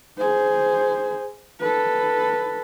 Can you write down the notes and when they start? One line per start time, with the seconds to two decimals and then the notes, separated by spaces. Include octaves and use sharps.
0.18 G#4 C5
1.60 A4 B4